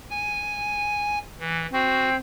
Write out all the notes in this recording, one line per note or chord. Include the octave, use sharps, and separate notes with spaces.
G#5
E3
C4 F#4